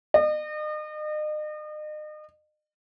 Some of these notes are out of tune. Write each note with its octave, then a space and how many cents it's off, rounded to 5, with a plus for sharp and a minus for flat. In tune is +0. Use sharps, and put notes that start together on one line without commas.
D#5 -40